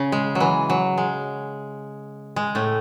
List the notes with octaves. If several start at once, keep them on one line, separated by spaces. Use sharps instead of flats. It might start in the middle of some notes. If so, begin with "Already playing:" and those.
Already playing: C#3
G#3
F#3
E3
F#3
G#3
G#3
A2 A3